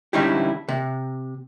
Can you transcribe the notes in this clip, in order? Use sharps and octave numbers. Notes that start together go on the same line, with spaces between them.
D3 G3 C#4 D#4 E4 G4
C3